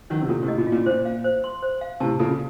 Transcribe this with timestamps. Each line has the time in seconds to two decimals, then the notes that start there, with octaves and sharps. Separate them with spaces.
0.10 D#3 F#3 C#4
0.22 C3
0.29 A#2 A4
0.43 A2 C3
0.48 D#5
0.58 A#2
0.67 F4
0.72 A#2
0.86 A#2 C5
1.05 F5
1.24 C5
1.44 C6
1.63 C5
1.81 F5
2.00 A2 C3 A5
2.19 A#2 C#3 A4